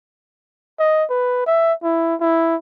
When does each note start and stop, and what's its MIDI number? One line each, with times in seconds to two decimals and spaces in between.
0.79 1.04 75
1.10 1.45 71
1.47 1.73 76
1.83 2.15 64
2.21 2.56 64